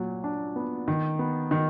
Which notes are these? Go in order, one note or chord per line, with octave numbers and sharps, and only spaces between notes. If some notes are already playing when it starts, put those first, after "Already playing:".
Already playing: A#2 F#3
D4
B3
D#3
B3
D#3